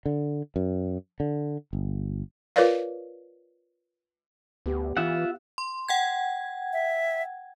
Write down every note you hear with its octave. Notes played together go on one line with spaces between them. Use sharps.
D3
F#2
D3
G1
F4 A#4 B4 C#5 D5 F5
D2 B3 G4
E3 F4 E5 F#5
C6
F#5 G5 G#6
E5